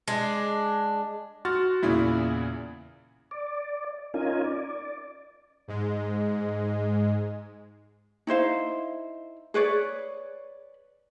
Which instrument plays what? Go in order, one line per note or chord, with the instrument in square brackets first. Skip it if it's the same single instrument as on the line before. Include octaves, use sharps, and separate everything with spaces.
[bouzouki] G#3 D4
[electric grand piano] F#4 [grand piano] C6 F6 A6
[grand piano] E2 A#2 C#3 [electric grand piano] E4
[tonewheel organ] D5
C#4 D#4 F4 A#4 G#5
D5
[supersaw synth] G#2 G#3
[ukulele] D#4 E4 C5 F5
G#4 B4 C#5 D5